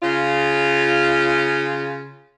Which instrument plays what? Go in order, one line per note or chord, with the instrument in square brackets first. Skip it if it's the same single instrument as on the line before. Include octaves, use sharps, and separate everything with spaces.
[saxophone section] C#3 F4